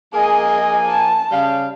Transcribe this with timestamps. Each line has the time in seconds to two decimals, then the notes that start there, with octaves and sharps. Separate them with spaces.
0.13 F3 A#3 G#4 D#5 G#5
0.86 A5
1.31 C#3 G3 F5